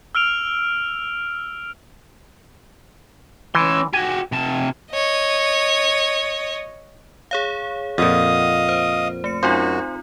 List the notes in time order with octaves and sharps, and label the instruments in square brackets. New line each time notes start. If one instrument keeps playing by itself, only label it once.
[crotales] E6 F6 D7 F7
[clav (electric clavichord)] E3 [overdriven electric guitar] C#4 C6
[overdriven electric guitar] F#4 G4 [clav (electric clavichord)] G#5
[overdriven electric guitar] C3 A5
[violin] C#5 D#5
[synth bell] G#4 C#5 F5
[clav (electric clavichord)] F2 A#2 [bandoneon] D#5 F5 D#6 [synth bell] F#5
[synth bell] C5
A3 C#7
[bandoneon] F#2 F#4 [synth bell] C4 D#4 F4 [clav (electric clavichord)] C5